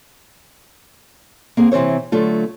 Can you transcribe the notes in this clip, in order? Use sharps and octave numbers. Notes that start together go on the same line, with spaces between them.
A#3 C4 G#4
C3 E3 C4 C5 C#5
D3 F#3 A3 F4